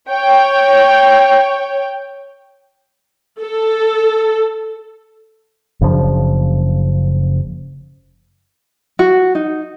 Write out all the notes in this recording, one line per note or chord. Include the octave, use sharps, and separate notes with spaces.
C#5 G5
A4
F#1 C#3 F3 D4
F#4
D#4